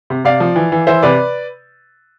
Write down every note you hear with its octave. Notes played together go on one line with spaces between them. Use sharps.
C3
C3 D5 F5
F3
E3
E3
E3 C5 E5
C3 B4 D5